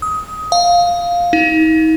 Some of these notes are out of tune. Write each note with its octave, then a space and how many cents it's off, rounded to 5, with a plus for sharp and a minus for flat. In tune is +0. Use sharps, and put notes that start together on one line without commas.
D#6 +20
F5 +5
D#4 +40